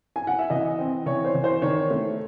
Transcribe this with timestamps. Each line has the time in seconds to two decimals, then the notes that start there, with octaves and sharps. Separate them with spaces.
0.16 G#5
0.27 F#5
0.39 E5
0.50 E3 D#5
0.79 C4
1.06 E3 C#5
1.24 C5
1.34 E3
1.44 C5
1.62 D#3 C#5
1.90 A3